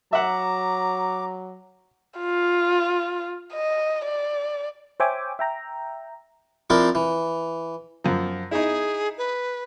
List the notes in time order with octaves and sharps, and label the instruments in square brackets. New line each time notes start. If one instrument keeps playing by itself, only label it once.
[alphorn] F#3 [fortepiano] E5 F#5 [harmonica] A#5 [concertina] D6
[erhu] F4
D#5
D5
[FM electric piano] C5 C#5 E5 G5 G#5 D6
E5 G5 A#5
[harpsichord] F3 C4 D4 E4 A#4
E3
[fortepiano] F#2 F3
[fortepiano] D#4 E4 [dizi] G#4
[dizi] B4